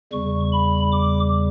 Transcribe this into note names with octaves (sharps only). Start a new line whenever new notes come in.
E2 C#3 G3 C#6
B5
D6